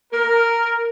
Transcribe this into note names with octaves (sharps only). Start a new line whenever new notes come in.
A#4